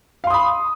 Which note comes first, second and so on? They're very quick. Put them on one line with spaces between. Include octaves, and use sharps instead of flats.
F5 C6 D#6 B5